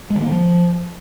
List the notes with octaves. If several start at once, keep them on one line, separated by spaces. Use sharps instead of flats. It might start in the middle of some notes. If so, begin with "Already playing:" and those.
G#3
D#3
A#3
D3
F3